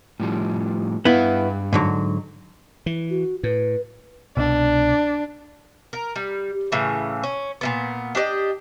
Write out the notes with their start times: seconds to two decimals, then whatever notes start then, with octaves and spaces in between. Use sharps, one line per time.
0.20 A2 F3 G3
1.05 G2 B3 E4 F5
1.73 G#2 D3 F#3
2.86 E3
3.10 F#4
3.43 A2 B4
4.37 C2 B2 D4
5.93 A#4
6.16 G3
6.72 A2 C#3 E3
7.23 C#4
7.61 A#2 C#3 B3
8.15 D4 G4 D5 D#5